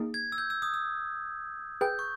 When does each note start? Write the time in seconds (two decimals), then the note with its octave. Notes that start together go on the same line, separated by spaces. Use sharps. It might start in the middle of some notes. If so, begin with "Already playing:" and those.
Already playing: A#3 D#4 G#4
0.14 G#6
0.32 E6
0.38 G6
0.50 E6
0.62 D#6
0.74 E6
1.81 G#4 B4 G5 G6
1.99 C#6